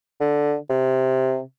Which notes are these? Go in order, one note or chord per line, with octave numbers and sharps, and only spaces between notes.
D3
C3